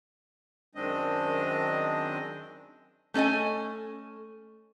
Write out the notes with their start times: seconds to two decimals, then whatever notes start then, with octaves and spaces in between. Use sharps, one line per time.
0.75 F#2 D#3 G#3 C4 D4 D#5
3.14 A3 C#4 A4 D#5 G#5